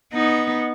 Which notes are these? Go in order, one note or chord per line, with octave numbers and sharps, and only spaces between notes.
B3 D#4